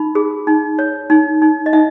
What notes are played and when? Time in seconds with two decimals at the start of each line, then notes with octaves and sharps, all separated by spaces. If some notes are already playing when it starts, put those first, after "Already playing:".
Already playing: D#4 B5
0.15 G#4
0.47 D#4
0.79 C#5
1.10 D#4
1.42 D#4
1.66 D#5
1.73 D#4 E5